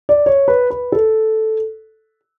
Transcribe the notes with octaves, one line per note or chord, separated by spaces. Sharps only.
D5
C#5
B4
B4
A4